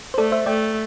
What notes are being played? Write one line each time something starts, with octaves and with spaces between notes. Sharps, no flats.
C5
A3 A4 D5
C5 E5
A3 D5 G5